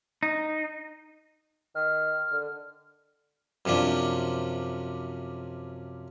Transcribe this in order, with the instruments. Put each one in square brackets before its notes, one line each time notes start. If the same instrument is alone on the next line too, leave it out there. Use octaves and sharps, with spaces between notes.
[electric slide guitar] D#4
[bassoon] D#3 [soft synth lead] F6
[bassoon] D3
[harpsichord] F#2 C3 F3 D4